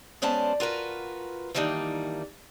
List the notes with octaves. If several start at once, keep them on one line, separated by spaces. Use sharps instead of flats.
G#3 B3 C#4 C5 D5 A5
F4 F#4 A#4 B4
D#3 E3 G3 A#3 D4 D#4